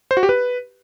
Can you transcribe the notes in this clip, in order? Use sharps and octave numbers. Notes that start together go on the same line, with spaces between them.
C5
F#4
G4
B4